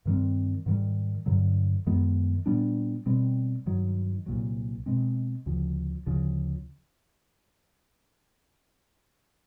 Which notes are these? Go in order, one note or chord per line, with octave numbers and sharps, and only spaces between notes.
G2 D#3 G3 C4
G#2 D#3 G3
G2 D3 F#3
F#2 D#3 G#3 B3
A#2 G3 B3 D4
B2 G3 C4
G2 D#3 F#3
C2 A#2 F#3
B2 G#3 C4
D2 C#3 F3
D2 C#3 F3